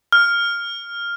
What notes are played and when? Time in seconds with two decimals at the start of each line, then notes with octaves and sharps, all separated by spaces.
0.12 F6